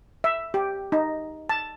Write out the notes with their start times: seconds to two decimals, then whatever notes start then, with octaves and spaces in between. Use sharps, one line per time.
0.24 E5
0.54 G4
0.92 D#4
1.49 A5